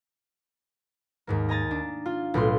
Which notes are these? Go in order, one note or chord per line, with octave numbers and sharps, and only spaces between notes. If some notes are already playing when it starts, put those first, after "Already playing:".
D#2 G#2 A#3
D#5 G#5 A#5 A6
D4
F4
B1 A2 F4 C6